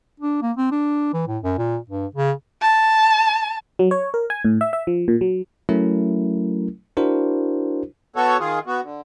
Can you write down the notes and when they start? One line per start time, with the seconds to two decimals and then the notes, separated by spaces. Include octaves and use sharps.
0.20 D4
0.42 A#3
0.57 C4
0.71 D4
1.13 E3
1.28 A2
1.44 F#2
1.58 A#2
1.90 G2
2.15 C#3
2.62 A5
3.79 F#3
3.91 C#5
4.14 A#4
4.30 G#5
4.45 A2
4.61 E5
4.73 E5
4.87 F3
5.08 A#2
5.21 F#3
5.69 F#3 A3 C#4 E4 A#4
6.97 D4 E4 F#4 A#4 C5
8.16 B3 F#4 A4 C#5
8.40 D#3 F4 G#4
8.67 B3 F#4
8.83 D3